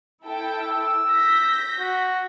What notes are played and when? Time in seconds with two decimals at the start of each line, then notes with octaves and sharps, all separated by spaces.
0.25 E4 A4 G5
0.60 E6
1.10 G6 A#6 B6
1.79 F#4